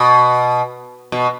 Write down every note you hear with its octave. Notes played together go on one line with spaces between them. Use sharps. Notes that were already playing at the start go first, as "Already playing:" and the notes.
Already playing: B2
B2